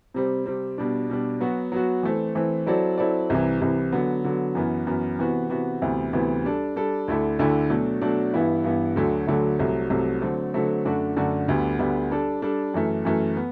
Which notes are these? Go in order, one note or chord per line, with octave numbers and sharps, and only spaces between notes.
C3 G3 C4
C3 G3 C4
B2 G3 D4
B2 G3 D4
F#3 B3 F#4
F#3 B3 F#4
E3 A3 C4
E3 A3 C4
F#3 C4 E4 A4 D5
F#3 C4 E4 A4 D5
C2 C3 E3
C2 C3 E3
D3 F#3 B3
D3 F#3 B3
F#2 E3 B3
F#2 E3 B3
C3 E3 B3 F#4
C3 E3 B3 F#4
D2 C3 E3 B3
D2 C3 E3 B3
G3 D4 A4
G3 D4 A4
D2 D3 A3 E4
D2 D3 A3 E4
B2 F#3 A3 D4
B2 F#3 A3 D4
G2 E3 B3 E4
G2 E3 B3 E4
D2 D3 F#3 A3
D2 D3 F#3 A3
C2 C3 F#3 A3
C2 C3 F#3 A3
D3 F#3 A3 C4
D3 F#3 A3 C4
F#2 D3 A3 D4 F#4
F#2 D3 A3 D4 F#4
D2 D3 G3 B3
D2 D3 G3 B3
G3 D4 A4
G3 D4 A4
F#2 E3 A3
F#2 E3 A3
B3